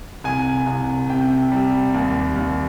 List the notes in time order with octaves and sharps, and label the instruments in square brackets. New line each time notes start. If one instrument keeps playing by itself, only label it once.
[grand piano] C2 G#5
C2
C3 G5
G3
D#2
D#2